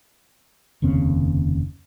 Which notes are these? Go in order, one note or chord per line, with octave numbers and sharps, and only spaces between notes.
F1 D#2 C#3 C4